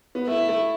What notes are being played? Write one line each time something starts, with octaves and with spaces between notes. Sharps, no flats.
B3
A3 E4
A3